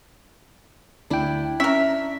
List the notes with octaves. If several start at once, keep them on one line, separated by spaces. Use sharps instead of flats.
D2 D4 E4 G5
C#4 A#4 E5 B6